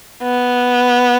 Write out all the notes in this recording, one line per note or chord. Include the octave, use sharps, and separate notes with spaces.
B3